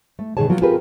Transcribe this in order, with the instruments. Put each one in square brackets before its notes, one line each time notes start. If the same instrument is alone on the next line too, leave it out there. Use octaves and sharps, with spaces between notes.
[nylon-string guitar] A3
B2 D#3 F#3 G#4 C#5 A5
F3 F#3 B3 F4
C4 F4 G4 G#4 A#4 B4